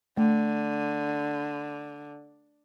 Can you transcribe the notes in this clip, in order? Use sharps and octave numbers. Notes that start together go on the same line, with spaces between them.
D3 A3